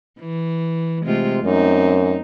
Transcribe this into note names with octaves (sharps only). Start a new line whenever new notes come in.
E3
C3 G#3 A3 F4
F#2 C4 D#4